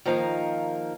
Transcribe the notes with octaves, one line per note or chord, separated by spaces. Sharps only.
D#3 F3 A#3 D#4 A#4 F5